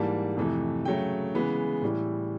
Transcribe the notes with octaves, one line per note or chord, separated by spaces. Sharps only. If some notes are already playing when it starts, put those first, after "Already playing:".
Already playing: G#2 E3 G3 A#3 A5
F2 C3 E3 A3
C#3 F#3 A3 G5
C#3 E3 G#3 B3
A2 E3 G3